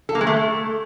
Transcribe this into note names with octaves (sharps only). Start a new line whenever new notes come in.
A4
A#3
G#3
A3